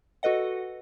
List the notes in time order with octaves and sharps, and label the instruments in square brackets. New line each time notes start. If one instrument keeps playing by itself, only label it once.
[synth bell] F#4 A4 B4 D#5 F#5